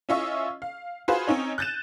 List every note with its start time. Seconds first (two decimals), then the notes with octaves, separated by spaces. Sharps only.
0.09 C#4 E4 F4 D#5 E5 C#6
0.62 F5
1.08 F4 F#4 G#4 B4 C5 F5
1.28 C4 C#4 D#4 C#5
1.58 F#6 G6 A6 D#7 E7